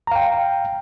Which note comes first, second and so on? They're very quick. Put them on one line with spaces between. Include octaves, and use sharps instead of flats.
A#5 F5 G5